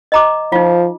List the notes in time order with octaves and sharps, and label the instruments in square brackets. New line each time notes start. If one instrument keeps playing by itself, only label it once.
[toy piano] D#5 A#5 D6
[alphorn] F3 [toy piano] D#4 F4